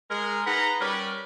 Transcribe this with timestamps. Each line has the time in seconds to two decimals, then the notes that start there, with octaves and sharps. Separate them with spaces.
0.11 G#3 A#4
0.47 D#4 G#4 B4 F#5 A#5
0.80 G3 C#4 A#4 B4 D5